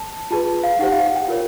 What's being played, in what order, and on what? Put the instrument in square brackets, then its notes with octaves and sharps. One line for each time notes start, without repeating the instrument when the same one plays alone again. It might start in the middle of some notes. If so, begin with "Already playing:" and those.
Already playing: [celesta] A5
F4 G#4 B4 A5
F5
D#4 G4 C5 F#5
F5
F#5
G5
F4 A#4 C#5